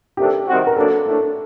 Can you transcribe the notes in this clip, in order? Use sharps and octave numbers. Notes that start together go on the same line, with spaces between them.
C3 D#3 A3 D4 G4 A4
C3 D#3 G3 C4 F#4
A#4
F#3 A#3 D4 A4
A2 A3 D4